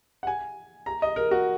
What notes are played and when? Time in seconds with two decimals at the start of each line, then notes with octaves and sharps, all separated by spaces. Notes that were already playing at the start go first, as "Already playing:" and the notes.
0.23 F#5
0.27 G#5
0.86 A#5
1.02 D#5
1.16 A#4
1.31 F#4